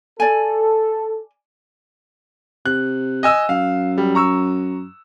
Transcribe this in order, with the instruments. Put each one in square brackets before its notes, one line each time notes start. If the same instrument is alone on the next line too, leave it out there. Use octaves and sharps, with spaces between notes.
[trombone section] A4 [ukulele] D5 G#5
[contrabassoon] C3 [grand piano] F#6
[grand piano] D#5 G#5 E6
[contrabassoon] F#2 [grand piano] F5
[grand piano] G3
A#5 C#6 E6